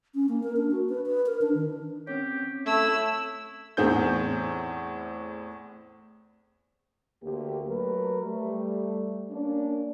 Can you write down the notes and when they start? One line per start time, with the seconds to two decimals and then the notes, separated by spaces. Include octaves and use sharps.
0.15 C#4
0.29 A#3
0.43 A#4
0.56 D4
0.71 F#4
0.89 B4
1.06 B4
1.26 A#4
1.41 D4
1.54 D#3
2.07 C4 C#4 G4 C#5
2.66 A3 E4 E6
3.77 E2 A2 C4 G#4 G6
7.22 D2 A#3 G4
7.67 F#3 A3 A#4 B4
8.22 G3 A3
9.30 A#3 C#4 D4